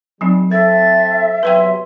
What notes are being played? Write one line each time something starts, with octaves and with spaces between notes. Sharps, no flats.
F#3 G3 C4 D#4
C4 A4 C5 E5 A6
E2 C3 F#3 B4 C5 E5 G5 C6